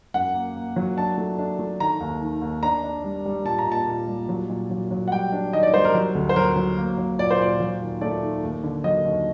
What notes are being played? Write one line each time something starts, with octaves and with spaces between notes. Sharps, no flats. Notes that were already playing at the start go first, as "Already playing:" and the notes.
F#2 F#5
A#3
A#3
F#3
D4 A5
A3
D4
A3
D#3 A#5
D#2
D#3
D#2
D4 A#5
D4
G3
G3
A#2 A5
A#5
A#2
A5
A#2
G3
F#3
A#2
F#3
F#3
F#5
G3 G5
D4
D#3 D#5
D5
G3 C5
A#4
F#3
D2
C5
F#3 A#4
F#3
A#3
F#3
A#2 D5
C5
A#2 D5
F#3
D#2
A3 D5
D#3
D#2
D3
F#3 D#5
D#2